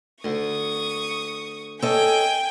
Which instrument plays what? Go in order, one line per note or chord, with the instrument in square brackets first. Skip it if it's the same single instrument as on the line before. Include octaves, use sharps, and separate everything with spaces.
[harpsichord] D2 [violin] C#6 D#6
[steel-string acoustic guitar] A4 C#5 D#5 [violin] G5 G#5